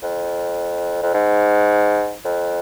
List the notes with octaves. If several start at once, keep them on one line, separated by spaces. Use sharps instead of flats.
F2
F2
G#2
F2